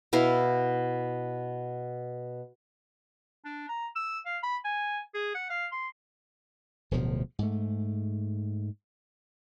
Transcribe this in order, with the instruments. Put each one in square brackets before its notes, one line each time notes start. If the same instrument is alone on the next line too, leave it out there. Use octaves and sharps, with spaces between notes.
[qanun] B2 B3 E4 F5
[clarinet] D4
A#5
E6
F5
B5
G#5
G#4
F#5
F5
C6
[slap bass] D1 D2 B2 F3
G#2 A3